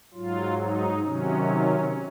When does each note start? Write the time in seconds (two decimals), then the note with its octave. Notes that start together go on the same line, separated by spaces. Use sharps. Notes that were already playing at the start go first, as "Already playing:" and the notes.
0.14 G#2 F#3 F4
0.58 D#4
1.03 C3 D#3 F#3 C#4